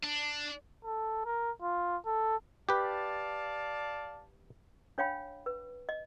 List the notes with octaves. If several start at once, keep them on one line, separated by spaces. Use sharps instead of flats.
D4
A4
A#4
F4
A4
G4 B4 D5 F5 A5
D4 C#5 F5 G5 B5
B4
D#5